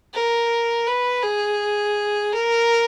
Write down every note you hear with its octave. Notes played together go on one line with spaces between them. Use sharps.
A#4
B4
G#4
A#4